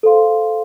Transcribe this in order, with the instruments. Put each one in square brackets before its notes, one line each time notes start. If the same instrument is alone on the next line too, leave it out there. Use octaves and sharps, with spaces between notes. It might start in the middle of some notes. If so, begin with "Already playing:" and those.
[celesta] A4 C5 F5 C6